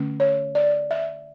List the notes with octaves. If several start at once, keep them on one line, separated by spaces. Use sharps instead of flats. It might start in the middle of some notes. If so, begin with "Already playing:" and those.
Already playing: D3 A3 C#4
C#5
D5
E5